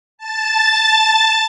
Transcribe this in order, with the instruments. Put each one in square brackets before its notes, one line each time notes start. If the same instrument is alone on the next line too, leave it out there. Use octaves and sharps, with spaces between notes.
[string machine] A5 A6